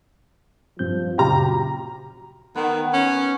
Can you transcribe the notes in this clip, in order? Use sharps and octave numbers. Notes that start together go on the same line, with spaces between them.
G2 F3 C4 G6
F#2 A#2 C#3 F#4 G4 A#5
D#3 B3
C#4